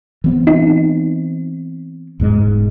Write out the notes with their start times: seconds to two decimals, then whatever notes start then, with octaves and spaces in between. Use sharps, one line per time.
0.24 E3 B3 C4
0.47 D#4
2.20 E1 G#2 G#3